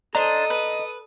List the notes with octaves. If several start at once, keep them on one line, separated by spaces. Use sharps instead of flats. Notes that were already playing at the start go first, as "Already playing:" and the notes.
D4 A4 C5 D#5 A#5 D#6
B4